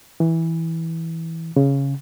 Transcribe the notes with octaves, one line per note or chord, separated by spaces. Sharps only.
E3
C#3